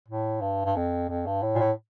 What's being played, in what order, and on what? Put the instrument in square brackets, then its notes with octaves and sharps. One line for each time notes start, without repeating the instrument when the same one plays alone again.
[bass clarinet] A2
G2
G2
F2
F2
G2
A2
A#2
A2